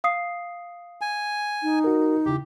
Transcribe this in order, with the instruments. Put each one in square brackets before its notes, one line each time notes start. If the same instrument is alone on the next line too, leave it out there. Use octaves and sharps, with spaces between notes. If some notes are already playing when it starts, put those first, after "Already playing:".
[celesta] F5 D#6 C7
[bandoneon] G#5
[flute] D#4
[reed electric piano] F#4 A#4
[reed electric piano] E2 C#3 E4 [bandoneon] G4